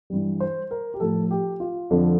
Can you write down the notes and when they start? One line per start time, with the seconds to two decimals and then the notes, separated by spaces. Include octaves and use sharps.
0.10 G2 E3 G3
0.40 C5
0.71 A#4
0.94 G4
1.00 A2 F3 A4
1.31 G4
1.60 F4
1.90 F2 D3 F3